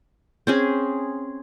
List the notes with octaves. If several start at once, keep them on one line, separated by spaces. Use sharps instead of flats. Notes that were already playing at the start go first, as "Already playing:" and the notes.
C4 C#4 G#4